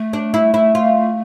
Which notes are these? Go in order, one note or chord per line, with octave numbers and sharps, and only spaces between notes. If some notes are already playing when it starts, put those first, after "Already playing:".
Already playing: A3
D4
E4
E4
F4